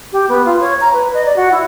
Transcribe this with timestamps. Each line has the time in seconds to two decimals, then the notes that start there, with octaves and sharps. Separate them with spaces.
0.13 G4
0.29 B3
0.45 F4
0.61 C#5
0.81 A#5
0.93 B4
1.14 D#5
1.25 D5
1.36 F#4
1.52 E4